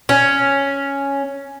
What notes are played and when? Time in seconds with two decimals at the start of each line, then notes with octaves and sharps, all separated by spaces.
0.09 C#4